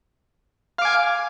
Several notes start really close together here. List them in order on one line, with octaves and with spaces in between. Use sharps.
F5 D6 G#5